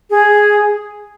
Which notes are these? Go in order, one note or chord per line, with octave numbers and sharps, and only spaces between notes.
G#4